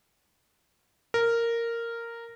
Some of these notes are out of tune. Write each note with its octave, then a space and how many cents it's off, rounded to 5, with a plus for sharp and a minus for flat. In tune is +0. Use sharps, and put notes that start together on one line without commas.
A#4 -10